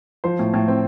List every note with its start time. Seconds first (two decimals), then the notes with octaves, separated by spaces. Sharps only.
0.24 F3 C5
0.39 A2
0.54 A2
0.68 C4